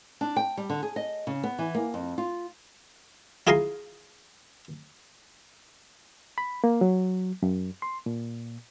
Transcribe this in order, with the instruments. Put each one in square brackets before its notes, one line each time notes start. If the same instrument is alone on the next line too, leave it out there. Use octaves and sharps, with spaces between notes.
[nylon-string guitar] D4
G5
G3
D3
G#4
D#5
C#3
B3
E3
A#3
F2
F4
[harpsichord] E4 F4 G#4 G#5 A#5 C6
[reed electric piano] B5
A#3
F#3
F#2
C6
A#2